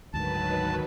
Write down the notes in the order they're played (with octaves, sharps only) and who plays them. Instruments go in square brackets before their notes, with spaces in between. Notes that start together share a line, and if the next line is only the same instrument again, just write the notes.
[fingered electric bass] D2 G#2 D3 [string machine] D#3 F#3 B4 [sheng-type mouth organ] A5